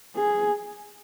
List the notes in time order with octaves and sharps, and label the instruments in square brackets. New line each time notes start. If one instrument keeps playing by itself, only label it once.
[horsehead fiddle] G#4